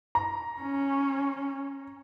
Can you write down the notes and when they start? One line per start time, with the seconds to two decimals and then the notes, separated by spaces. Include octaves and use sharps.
0.15 A#5
0.62 C#4